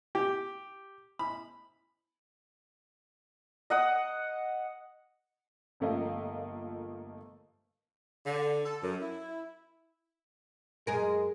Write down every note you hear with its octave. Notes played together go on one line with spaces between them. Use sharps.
G4
B5
D#5 F#5 D#6
G1 F3 A3 A#3 D#5
D3
A4
F#2
E4
F#2 G#3 G#4 A#4